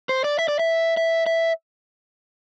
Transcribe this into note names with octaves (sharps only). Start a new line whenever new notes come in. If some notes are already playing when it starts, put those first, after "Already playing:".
C5
D5
E5
D5
E5
E5
E5